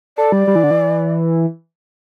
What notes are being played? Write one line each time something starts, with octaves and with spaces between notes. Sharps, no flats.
A4 D5
G3
G3
E3
D3
E3